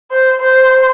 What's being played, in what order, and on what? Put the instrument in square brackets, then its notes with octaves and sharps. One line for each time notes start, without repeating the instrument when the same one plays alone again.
[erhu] C5
C5